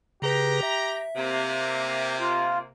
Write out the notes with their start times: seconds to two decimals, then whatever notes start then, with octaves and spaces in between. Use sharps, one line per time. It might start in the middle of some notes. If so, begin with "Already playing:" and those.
0.22 C#3 G4 G#4 B4 A#5
0.63 E5
1.16 C3 A#3
2.20 F4